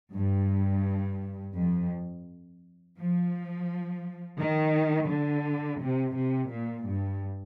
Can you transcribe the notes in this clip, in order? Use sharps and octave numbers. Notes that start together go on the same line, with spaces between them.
G2
F2
F3
D#3
D3
C3
C3
A#2
G2